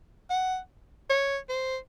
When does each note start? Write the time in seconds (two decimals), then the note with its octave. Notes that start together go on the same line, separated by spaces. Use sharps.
0.30 F#5
1.10 C#5
1.49 C5